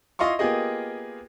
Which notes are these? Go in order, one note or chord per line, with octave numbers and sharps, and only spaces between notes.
E4 F4 D#5 F5 C6 C#6
A#3 B3 F4 G4 G#4 D#5